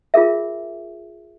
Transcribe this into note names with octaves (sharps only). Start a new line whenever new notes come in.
F4 G#4 A#4 E5